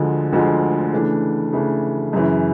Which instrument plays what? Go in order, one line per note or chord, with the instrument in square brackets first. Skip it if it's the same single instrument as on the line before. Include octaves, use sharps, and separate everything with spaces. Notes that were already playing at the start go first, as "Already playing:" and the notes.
Already playing: [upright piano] D2 D3 F3 G#3
D2 D3 F3 G#3
C#3 E3 A3 D4
C#3 E3 A3 D4
F#2 C#3 E3